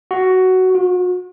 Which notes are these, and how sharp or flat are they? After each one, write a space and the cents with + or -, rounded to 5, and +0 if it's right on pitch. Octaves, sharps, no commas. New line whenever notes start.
F#4 +10
F#4 -40